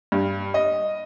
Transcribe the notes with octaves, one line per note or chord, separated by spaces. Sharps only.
G2
D#5